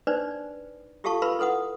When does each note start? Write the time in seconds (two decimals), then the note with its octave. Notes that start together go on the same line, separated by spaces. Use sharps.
0.07 D4 D#4 B4 C5 D5
1.04 F4 G4 A4 F5 A5 C#6
1.22 F4 A#4 B4 F5 B5 C6
1.39 E4 A4 B4 F#5 D#6